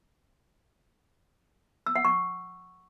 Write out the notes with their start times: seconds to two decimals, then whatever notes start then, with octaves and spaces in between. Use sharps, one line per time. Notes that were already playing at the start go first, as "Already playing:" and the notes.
1.86 E6
1.96 F#5
2.05 C#6